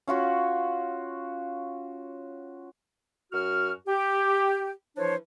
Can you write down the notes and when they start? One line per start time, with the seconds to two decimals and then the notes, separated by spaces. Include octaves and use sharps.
0.08 C#4 F4 F#4 C#5
3.33 F#2 F#4 F6
3.87 G4
4.97 E3 F3 D4 C5 C#5